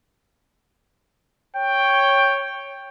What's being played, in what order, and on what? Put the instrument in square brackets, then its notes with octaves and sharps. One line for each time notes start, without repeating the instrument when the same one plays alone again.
[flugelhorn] C#5 [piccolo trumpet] G5